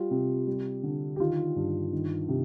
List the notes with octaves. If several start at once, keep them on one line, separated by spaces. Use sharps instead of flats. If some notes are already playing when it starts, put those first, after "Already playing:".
Already playing: G3 F4
C3
G3
D3
G4
D#3 F4
G2
D#3
C3